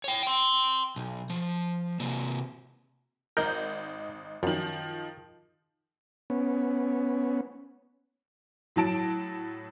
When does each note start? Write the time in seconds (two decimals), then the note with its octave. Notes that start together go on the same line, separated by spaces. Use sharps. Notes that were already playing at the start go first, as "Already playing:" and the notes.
0.04 C#5 G5
0.23 G5 C6
0.96 B1
1.30 F3
2.00 C3 A#3
3.37 G#1 D#4 A#4 G6
4.43 F#2 D#3 F3
6.30 B3 C#4
8.76 A2 F#3 A5 D7